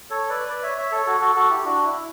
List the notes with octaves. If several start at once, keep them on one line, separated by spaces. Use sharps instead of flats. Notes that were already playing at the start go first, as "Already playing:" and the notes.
A4 C#5
B4 D5
B4 D5
C#5 E5
C#5 E5
A4 C#5
F#4 A4
F#4 A4
F#4 A4
E4 G4
D4 F#4
E4